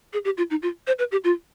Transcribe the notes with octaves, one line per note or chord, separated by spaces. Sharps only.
G#4
G4
F4
D#4
F4
C5
B4
G4
F4